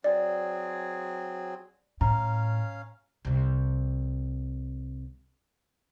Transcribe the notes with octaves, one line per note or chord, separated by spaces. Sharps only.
F#3 C4 G#4 D5
A2 C#4 F5 A#5
C2 C3